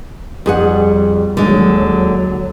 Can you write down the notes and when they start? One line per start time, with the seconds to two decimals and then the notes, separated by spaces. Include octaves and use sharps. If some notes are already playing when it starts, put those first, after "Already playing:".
0.46 F2 G3 G#4 F#5
1.37 D#2 D3 F#3 G#3